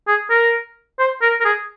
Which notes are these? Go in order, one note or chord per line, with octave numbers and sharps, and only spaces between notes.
G#4
A#4
C5
A#4
A#4
G#4